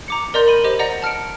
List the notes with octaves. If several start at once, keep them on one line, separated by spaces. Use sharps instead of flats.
A#5 D6 C#7
A#4 D5 D#5 A#5 C6 G6
B5 D#7
G4 C5 D#5
D5 D#5 F#5 A#5 A#6
A5 F6 C#7 D7